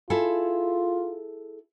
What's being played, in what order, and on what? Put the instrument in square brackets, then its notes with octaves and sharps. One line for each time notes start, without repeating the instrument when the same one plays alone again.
[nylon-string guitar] E4 G#4 A4 [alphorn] F4